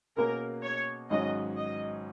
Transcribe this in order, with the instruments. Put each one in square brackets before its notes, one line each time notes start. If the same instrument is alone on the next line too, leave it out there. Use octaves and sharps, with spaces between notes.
[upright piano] B2 A#3 C#4 G#4 [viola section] A#4
[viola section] C#5
[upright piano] G#1 G#2 F#3 C#4 F#4 [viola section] D#5
[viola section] D#5